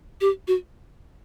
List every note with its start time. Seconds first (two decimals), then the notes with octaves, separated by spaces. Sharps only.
0.21 G4
0.47 F#4